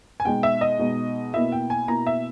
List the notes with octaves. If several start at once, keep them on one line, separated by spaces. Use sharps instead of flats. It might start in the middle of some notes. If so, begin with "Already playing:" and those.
G#5
B2 G#3 D#4 G5
E5
D#5
B2 G#3 D#4
B2 A#3 E4 E5
G5
G#5
B2 A#3 E4 A#5
E5